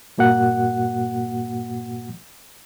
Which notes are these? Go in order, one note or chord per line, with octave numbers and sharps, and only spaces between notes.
G2 A#2 A#3 F#4 F#5